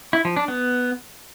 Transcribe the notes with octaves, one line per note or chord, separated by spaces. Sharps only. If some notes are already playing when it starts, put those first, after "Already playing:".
E4
F3
D4
B3